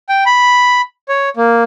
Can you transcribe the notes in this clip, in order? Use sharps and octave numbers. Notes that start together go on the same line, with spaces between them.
G5
B5
C#5
A#3